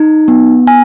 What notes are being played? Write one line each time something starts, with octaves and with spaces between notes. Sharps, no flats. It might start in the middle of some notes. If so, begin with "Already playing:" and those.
Already playing: D#4
B3
G#5